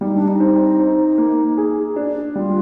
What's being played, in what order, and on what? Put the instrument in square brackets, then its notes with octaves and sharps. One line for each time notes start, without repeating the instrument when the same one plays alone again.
[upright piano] G3 [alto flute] D#4
[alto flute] D4
D#4
[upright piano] C4
C5
A#3
G#4
D4
[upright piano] G3 [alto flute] F4